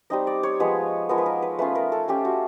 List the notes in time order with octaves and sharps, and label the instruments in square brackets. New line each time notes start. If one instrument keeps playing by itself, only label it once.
[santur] G3 C4 D#4 D#5
D5
C#5
F3 G#3 B3 B4
F3 G#3 B3 A#4
B4
A#4
B4
A3 C#4 F4 B4
A#4
A4
A3 C#4 F4 G4
F#4